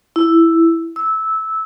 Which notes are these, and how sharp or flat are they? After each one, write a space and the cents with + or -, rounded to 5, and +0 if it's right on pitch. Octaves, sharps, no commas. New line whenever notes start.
E4 +5
E6 -15